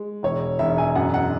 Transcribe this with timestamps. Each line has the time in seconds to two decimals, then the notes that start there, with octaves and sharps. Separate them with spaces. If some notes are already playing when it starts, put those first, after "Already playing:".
Already playing: G#3
0.23 E1 C#5
0.59 E1 E5
0.78 G#5
0.95 F#2 F#5
1.14 F#5